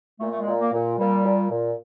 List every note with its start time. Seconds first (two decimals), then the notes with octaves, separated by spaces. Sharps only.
0.20 A#2 A3
0.31 A3
0.40 G#3
0.46 A#2
0.59 A#3
0.73 A#2
0.98 A#2 G3
1.24 A#2
1.51 A#2